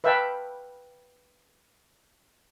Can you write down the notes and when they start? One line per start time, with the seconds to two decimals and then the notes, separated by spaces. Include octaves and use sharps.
0.04 B4 E5 F5 G5 A5